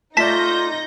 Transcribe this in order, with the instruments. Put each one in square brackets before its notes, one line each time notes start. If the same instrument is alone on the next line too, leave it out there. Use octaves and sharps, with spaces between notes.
[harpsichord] A3 D5 [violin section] D#4 G6 A#6 [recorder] F4 [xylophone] A5 B6